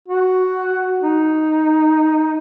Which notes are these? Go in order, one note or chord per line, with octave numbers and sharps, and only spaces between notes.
F#4
D#4